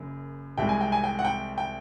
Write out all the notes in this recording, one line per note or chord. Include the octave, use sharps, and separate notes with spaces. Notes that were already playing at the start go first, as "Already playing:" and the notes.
Already playing: F#1 F#2 C#3
C2 C3 E3 G#3 G5
G#5
G5
G#5
G5
F#5
G5
G5